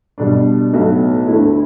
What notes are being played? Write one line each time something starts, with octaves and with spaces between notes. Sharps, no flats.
B2 G3 D4
B1 A2 F#3 B3
D2 D3 A3 E4